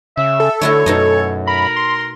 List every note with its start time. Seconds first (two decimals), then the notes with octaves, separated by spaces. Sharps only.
0.17 C#3 E5
0.40 A4
0.61 D3 A3 E4 F#4 C#5
0.86 F#2 B2 D#4 D#5
1.47 A#4 B5
1.76 C6